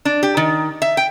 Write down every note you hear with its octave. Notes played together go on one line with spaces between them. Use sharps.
D4
G4
D#3
E5
G5